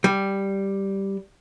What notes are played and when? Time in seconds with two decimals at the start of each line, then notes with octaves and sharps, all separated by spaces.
0.04 G3